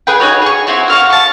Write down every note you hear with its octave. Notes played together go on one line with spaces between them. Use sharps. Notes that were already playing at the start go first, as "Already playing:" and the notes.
G#4 B4 G5
D#4 E4 F#4 C#5
G#4 C#6
C4 E4 F#4 C#5
F#4 F5 C#6
A5 C#6